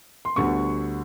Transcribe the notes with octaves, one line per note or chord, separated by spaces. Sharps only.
C6
D2 D3 G3 B3 C#6